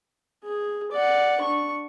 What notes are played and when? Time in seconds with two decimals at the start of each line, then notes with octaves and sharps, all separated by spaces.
0.44 G#4
0.92 D5 F#5
1.41 D4 C#6